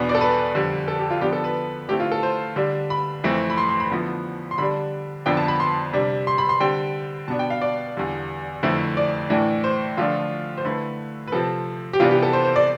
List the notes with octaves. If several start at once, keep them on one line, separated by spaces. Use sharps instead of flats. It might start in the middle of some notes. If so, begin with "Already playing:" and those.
Already playing: E2 B2 B3 D4
D5
A4
B4
F2 D3 G3
A4
G4
F4
D3 F3 B3 D4 G4
A4
B4
D3 A3 C4 E4 G4
F4
A4
C5
D3 G3 D4
B5
F2 E3 A3 C4
B5
C6
C6
B5
D3 F3 B3 E4
C6
D3 G3 D4 B5
F2 D3 F3 B3 D4 G5
A5
B5
C6
C3 G3 D4
C6
B5
C6
D3 G3 C4 G5
B2 B3 D4 A5
G5
F5
D5
E2 D3 G3
F2 D3 A3 C4 E4
D5
A2 E3 A3 D4
C5
D3 F3 A3 D4 F4
C5
D3 A3 E4 B4
B4
C3 F3 C4 A4
G4
C3 E3 G3 B3 D4 F4
G4
A4
C5
C5
D5